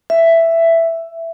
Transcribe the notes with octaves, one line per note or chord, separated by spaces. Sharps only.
E5